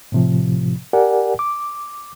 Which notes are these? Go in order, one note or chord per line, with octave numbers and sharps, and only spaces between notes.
A2 C3 F3
G4 A#4 D5 F#5 G#5
D6